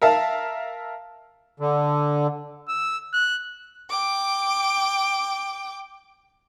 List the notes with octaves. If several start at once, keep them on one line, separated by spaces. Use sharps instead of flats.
A#4 E5 F5 A5
D3
E6
F#6
G5 D6